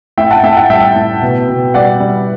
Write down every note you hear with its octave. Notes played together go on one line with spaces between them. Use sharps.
A2 E5 G5
F#5 A5
A2 E5 G5
F#5 A5
G3 E5 G5
A2
B2
B2
G3 D5 F#5
G3